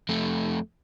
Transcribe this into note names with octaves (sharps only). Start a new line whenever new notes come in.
F2 A3